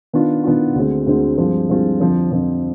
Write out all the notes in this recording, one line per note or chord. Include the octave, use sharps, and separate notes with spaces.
D#3 B3 D4 F4
D#3 B3 D4 F4
D2 D3 G#3 C4
D2 D3 G#3 C4
G2 F3 G#3 C4 F4
G2 F3 G#3 C4 F4
F2 D3 F3 C4
F2 D3 F3 C4